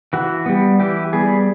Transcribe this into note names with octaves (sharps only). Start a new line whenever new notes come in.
E3 F#4
G3 B3
E3 G4
G3 B3 G#4